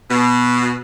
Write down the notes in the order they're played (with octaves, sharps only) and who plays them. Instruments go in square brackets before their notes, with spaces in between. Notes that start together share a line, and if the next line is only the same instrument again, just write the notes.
[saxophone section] B2